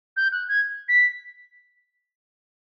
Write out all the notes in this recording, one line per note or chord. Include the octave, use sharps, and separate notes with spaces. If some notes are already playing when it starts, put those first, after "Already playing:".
G6
F#6
G#6
B6